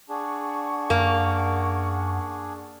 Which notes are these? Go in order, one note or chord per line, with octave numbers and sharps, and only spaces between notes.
D4 G#4 F#5 C#6
F#2 A#3